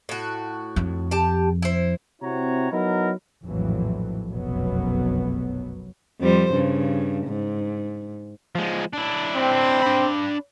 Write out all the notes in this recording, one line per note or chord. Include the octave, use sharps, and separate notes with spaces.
A2 F#4
F2
G4 A5
E4 C5
C3 C4 E4 F#4 C#5 A#5
F#3 B3 D#4 E4 A#4
A#1 F2 A2 E3 F#3
F1 B1 F#2 B2 F#3 B3
F2 G3 C5
G2 C#3
G#2
F3 G#3
D4 E4
C4
D4 B5